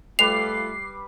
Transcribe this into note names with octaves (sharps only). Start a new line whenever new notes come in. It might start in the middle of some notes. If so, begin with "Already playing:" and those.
G3 A3 F4 B4 D6 C7 F7